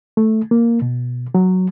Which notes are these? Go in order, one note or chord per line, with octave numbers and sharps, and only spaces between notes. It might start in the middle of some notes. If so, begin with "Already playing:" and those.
A3
A#3
B2
F#3